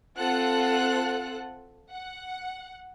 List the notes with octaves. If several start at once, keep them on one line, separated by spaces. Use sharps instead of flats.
C4 F4 A4 F#5 F#6
F#5